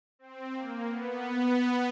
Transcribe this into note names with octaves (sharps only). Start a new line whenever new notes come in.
C4
A#3
B3